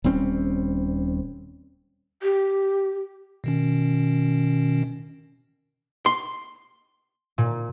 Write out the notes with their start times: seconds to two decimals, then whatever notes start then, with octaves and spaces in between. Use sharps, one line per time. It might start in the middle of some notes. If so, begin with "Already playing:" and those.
0.04 D#1 G3 C4 C#4
2.23 G4
3.44 B2 D#3 C#4
6.06 C6
7.38 A#2